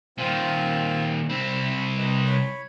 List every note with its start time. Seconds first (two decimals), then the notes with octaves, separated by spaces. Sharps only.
0.18 A#2 D#3 C4 F4
1.30 C2 C4 B5
1.98 B4 D#5
2.25 C#5 B5